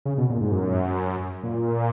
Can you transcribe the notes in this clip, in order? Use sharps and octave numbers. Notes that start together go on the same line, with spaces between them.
C#3
B2
A#2
G#2
F#2
A#2